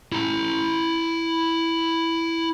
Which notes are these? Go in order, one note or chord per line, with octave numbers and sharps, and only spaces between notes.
E4 A#5